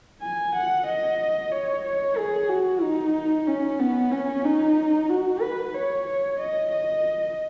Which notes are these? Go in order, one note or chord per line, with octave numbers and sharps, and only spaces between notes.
G#5
F#5
D#5
C#5
C#5
G#4
F#4
D#4
C#4
B3
C#4
D#4
F#4
B4
C#5
C#5
D#5
D#5